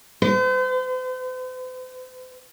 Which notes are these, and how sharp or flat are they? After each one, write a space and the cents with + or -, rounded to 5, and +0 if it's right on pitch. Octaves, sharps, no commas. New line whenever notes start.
C5 -45